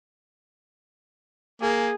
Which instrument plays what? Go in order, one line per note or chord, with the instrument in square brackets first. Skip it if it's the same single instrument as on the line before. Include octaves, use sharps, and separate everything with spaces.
[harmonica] A#3 [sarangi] G#4